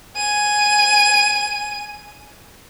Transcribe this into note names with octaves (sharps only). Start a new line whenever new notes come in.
G#5 D#7